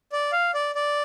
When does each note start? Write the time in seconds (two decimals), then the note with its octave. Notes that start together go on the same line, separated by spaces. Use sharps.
0.12 D5
0.32 F5
0.54 D5
0.75 D5